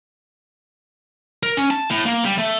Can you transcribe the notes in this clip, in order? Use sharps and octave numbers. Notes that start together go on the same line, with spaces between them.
A#4
C#4
A5
A2
A#3
G3
A3